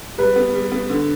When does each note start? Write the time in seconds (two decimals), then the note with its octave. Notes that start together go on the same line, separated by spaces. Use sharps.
0.18 G3 B4
0.36 B3
0.53 G3
0.71 B3
0.89 D3